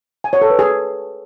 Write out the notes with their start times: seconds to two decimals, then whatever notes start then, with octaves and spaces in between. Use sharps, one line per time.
0.24 G#5
0.33 C#5
0.42 A4
0.50 B4
0.59 G#4